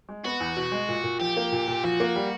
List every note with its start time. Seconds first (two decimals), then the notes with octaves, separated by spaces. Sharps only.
0.09 G#3
0.25 B3 F#4
0.40 E2
0.56 B2
0.72 G#3
0.89 A#2
1.04 A#2
1.20 F3 G4
1.37 A#3
1.52 A#2
1.68 A#2
1.84 F3 F#4
2.00 A#3
2.16 G3